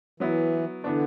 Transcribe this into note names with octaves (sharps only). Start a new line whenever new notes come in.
E3 F#3 B3 E4
D3 E3 B3 D4